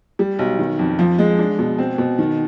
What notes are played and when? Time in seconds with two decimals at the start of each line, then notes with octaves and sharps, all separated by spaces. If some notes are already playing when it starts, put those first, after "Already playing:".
0.19 G3
0.39 B1
0.59 D#3
0.79 F2
0.99 F3
1.18 G#3
1.39 D4
1.59 B2
1.79 C4
1.98 B2
2.19 D#3